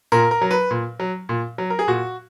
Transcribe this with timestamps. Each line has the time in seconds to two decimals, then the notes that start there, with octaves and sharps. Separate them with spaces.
0.12 A#2 A#4
0.31 A#4
0.42 F#3
0.51 B4
0.71 A#2
1.00 F#3
1.29 A#2
1.58 F#3
1.70 A#4
1.79 G#4
1.88 A#2 F#4